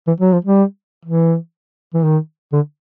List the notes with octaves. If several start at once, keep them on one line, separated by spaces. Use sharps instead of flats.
E3
F#3
F3
G3
E3
E3
D#3
D3